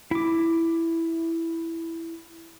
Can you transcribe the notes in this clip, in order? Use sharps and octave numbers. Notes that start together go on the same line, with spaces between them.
E4 D6